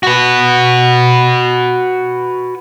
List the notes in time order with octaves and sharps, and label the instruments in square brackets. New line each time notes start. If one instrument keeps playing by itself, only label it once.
[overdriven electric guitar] F#4 B4